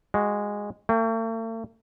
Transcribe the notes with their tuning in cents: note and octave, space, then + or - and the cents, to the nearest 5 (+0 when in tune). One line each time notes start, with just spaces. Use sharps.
G#3 -10 F#4 -5
A3 +45 G5 +0